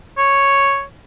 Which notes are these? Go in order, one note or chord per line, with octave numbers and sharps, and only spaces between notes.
C#5